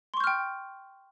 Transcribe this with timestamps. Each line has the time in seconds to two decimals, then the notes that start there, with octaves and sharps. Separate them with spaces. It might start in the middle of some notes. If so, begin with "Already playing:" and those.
0.14 C6
0.17 C#6
0.20 G6
0.24 F6
0.27 G5